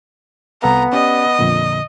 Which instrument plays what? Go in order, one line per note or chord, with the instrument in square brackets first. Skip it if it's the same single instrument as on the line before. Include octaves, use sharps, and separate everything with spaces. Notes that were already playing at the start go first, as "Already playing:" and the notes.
[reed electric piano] C2 A4 F5 [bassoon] B3 [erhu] A#5
[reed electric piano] C#4 G4 D5 [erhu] D#5
[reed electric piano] F2 A#2 D3